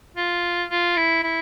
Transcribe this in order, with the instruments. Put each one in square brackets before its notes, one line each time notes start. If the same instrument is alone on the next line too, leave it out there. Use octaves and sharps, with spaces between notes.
[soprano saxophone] F4
F4
E4
E4